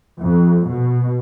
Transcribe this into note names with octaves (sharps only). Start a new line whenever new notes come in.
F2
B2